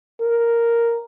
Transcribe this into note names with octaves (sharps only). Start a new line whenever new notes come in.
A#4